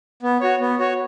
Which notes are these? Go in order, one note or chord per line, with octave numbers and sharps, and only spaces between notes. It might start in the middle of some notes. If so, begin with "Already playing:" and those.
B3
F#4 C#5
B3
F#4 C#5